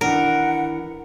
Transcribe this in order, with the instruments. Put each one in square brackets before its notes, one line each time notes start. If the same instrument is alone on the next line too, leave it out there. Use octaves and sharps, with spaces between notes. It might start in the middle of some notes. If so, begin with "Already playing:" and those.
[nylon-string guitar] D#3 E3 D4 [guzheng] A#4 [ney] F#5